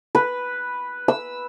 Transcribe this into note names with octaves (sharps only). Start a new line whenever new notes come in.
B4
E6